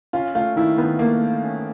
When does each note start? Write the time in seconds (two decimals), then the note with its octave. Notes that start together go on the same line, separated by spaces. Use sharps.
0.13 C#4 F4
0.35 A3 F4
0.56 D#3 E4
0.77 D#3 B3
0.99 A3 A#3
1.21 A3
1.44 C#4